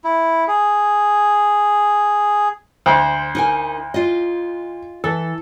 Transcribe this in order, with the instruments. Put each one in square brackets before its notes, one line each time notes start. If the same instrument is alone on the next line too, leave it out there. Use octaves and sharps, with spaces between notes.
[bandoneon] E4
G#4
[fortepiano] D2 C5
[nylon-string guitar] D#4 A#4 G#5
F4 D#5
[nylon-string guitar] E3 [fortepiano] A4